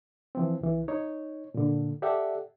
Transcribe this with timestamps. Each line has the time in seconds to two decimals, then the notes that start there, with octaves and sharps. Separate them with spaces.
0.35 E3 F3 C4
0.61 C2 E3
0.88 D#4 C#5
1.54 A#2 D3
2.02 G4 A4 D5 E5 F#5